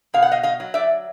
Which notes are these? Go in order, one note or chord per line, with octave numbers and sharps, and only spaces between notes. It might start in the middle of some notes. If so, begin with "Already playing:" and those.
B2 F5
F#5
D#5 F5
D#5 F5
F#3
D5 E5